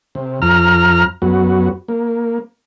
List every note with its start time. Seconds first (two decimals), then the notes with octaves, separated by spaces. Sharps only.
0.15 C3
0.42 F2 A#5 F6
1.22 F#2 B3 F#4
1.88 A#3